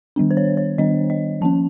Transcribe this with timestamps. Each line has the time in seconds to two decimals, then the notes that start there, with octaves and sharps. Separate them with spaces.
0.16 D#3 G3 B3 D4
0.31 C5
0.37 C#5
0.57 C#5
0.78 D#3 G3 B3 D4 D#5
1.10 D#5
1.41 F3 A#3 C#4 A5